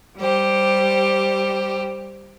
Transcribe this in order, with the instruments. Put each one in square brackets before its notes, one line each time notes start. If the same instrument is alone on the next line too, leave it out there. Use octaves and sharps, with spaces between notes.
[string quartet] G3 G4 C5